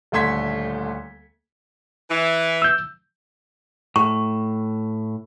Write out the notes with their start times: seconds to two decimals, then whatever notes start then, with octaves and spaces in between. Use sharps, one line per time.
0.12 D#1 D2 A3 C6 G#6 B6
2.10 E3
2.62 E6 G6
3.96 A2 C#6